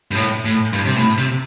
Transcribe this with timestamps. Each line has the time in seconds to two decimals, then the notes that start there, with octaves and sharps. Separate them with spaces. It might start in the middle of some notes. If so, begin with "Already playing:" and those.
0.11 G2
0.15 A2
0.45 A2
0.73 G2
0.85 C3
0.96 A2
1.18 C3